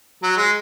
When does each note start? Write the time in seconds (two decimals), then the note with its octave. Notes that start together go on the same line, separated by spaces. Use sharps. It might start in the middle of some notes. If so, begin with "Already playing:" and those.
0.23 F#3
0.37 G#3